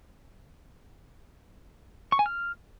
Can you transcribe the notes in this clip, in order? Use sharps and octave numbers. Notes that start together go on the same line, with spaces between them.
C#6
G#5
F6